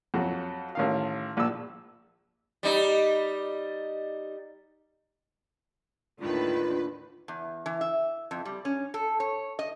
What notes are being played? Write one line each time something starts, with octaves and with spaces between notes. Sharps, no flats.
F2 F#3 F#4
A1 D#3 F5
A#1 E6
G3 D#4
D#2 A2 D3 D#3 F4 B4
E2
E3
E5
F2
G3
C#4
A4
C#5
D#5